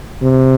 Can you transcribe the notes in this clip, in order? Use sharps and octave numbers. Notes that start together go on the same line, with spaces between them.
C3